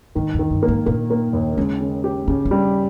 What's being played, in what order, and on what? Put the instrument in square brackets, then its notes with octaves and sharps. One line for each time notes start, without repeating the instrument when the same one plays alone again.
[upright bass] G#2 [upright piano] D#3
[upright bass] E2
[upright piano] D#3
[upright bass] G2
[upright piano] A#3
[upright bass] G#2
[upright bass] A#2 [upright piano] A#3
[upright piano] A#3
D#2
[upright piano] C#3 [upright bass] G#3
[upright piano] C#3
G4
[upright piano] C#3 [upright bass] C#4
[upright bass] C#4
[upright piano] G3